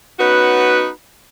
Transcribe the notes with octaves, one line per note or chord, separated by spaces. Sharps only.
B3 C#4 D#4 F#4 B4